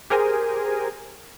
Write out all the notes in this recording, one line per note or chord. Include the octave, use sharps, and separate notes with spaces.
G4 G#4 A#4 C5 G#5